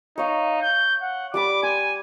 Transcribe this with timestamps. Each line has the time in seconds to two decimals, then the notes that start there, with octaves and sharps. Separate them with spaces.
0.18 D#4 C#5 F5
0.62 G6
1.02 F#5
1.34 G3 D5 B5 D6
1.63 G#5 C6